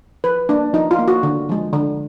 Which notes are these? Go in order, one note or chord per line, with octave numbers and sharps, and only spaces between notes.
F3 B4
A#3 D4
F3 D#4
F4
A#3
F#4
D3
F3 G#3
D3